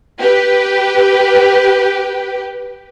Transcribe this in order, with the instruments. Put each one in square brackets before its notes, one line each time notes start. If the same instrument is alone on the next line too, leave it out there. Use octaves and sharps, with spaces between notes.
[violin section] G4 B4